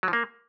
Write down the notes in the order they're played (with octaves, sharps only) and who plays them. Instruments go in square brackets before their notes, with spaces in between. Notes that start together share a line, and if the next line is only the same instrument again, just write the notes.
[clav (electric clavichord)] F#3
F3
A#3